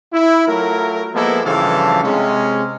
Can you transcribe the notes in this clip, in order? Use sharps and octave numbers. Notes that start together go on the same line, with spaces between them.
E4
F#3 A3 F4 A#4
F3 G#3 A#3 B3 E4 A4
G2 C#3 E3 F3 A4 F5
C3 G#3 C#4